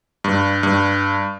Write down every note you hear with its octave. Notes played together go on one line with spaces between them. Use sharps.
G2
G2